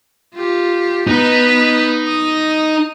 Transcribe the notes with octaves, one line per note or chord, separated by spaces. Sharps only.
F4 G4
B3 D#4 B4
D#6